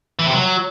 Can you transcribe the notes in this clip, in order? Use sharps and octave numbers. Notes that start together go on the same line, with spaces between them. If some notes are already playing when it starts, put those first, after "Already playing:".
E3
C3
F#3